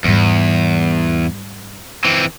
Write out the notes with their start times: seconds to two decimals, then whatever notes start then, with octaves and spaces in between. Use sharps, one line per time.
0.04 E2 G#2 G3
2.05 E3 C4